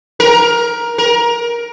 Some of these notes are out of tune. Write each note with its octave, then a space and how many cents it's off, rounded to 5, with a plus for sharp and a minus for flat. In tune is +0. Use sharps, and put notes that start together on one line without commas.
A#4 +15
A#4 +20